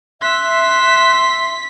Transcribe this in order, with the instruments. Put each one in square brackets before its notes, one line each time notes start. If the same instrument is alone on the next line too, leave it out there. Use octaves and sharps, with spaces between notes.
[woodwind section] E5 [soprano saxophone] C6 [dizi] F#6 [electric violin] B6